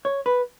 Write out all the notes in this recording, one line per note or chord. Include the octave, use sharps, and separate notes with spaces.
C#5
B4